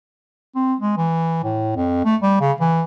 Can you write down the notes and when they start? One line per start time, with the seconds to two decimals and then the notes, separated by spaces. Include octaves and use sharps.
0.55 C4
0.80 G#3
0.97 E3
1.44 A2
1.76 F2
2.05 A3
2.22 G3
2.40 C#3
2.60 E3